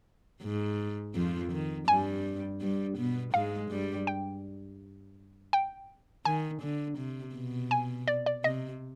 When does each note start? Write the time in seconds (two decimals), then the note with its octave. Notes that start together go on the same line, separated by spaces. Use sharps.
0.42 G#2
1.15 F2 F3
1.52 D#3
1.88 G2 G3 G#5
2.61 G2 G3
2.98 B2 B3
3.34 G#2 G#3 F5
3.70 G2 G3
4.07 G5
5.53 G5
6.25 D#3 G#5
6.62 D3
6.98 C3
7.35 B2
7.71 G#5
8.08 D5
8.26 D5
8.44 C3 D#5